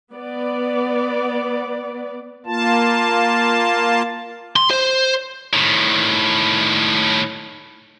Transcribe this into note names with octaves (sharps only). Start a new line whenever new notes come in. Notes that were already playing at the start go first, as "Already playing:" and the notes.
B3 D5
A#3 F4 A5
C6
C5
A2 D#3